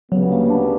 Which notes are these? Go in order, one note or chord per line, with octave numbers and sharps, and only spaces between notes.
D2 C#3 F#3 G3 B3
A#3
D4